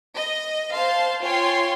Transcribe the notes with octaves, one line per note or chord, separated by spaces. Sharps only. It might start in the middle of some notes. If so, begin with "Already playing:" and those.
D#5
C5 F5 A5 C6
F4 C#5 G5 G#5 C6